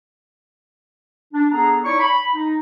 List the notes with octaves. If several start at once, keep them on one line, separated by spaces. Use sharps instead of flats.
D4
B3 D4 G#4 A4 A#5
D#4 E4 C#5 D5 C#6
B5
D#4